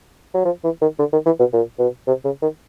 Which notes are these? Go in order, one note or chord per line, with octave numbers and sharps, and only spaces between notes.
F#3
F3
E3
D#3
D3
D#3
E3
B2
A#2
B2
C3
C#3
D#3